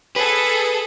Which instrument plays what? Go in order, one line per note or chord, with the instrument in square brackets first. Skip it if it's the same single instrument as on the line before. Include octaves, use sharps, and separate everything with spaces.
[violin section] G#4 A4 [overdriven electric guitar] B4